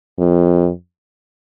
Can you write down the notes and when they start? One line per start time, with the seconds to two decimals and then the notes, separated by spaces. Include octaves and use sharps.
0.18 F2